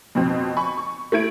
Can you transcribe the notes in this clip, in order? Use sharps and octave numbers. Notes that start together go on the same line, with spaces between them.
F2 B2 C4
G#5 B5 C#6
C#6
A3 E4 G#6 D7